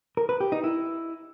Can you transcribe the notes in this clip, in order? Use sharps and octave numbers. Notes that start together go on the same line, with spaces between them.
A#4
B4
G4
D#4
E4